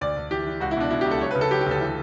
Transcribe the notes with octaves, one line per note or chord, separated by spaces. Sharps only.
D2 D5
D2
E3 G4
E3
C#2 F#4
E4
B2 D4
B2 E4
G4
C#2
A4
F#3 C#5
B4
C#3
A4
F#3 G4
G4
D2
A4
E3